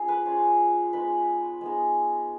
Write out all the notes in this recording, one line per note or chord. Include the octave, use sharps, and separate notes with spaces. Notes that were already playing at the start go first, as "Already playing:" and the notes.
Already playing: C#4 F4 G#4
B4
G#3 C#4 F4
G#3 B3 D#4 B4
G#3 B3 D#4